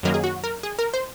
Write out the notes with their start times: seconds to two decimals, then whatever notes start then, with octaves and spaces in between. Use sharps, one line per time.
0.03 F#2 D#3 F#3 A#3 A#4
0.14 G#4
0.24 F#4
0.44 A#4
0.63 G#4
0.79 A#4
0.94 C5